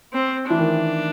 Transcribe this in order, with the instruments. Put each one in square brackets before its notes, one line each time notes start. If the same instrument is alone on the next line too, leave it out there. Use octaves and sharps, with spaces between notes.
[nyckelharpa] C4
[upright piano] E3 [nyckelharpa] D4
[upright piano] D#3